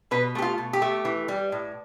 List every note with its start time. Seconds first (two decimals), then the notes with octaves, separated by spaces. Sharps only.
0.11 B2 B4
0.35 A3 G4
0.42 F4
0.58 B2
0.73 G4
0.82 A3
1.05 E3
1.28 G3
1.52 A2